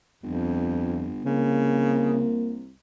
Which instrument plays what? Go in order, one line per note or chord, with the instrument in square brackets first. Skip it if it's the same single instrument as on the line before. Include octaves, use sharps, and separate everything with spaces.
[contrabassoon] G1 [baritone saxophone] F2
[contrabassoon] C2 [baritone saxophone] C#3 [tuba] A#3